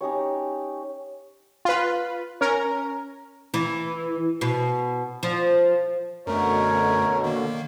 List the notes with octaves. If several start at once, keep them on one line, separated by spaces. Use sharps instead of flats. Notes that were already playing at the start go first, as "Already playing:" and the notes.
C#4 D#4 G4 C#5
F4 B4
C#4 A#4
E3
B2
F3
F#2 B2 D3 A3 A#4 C#5
D#3 A#3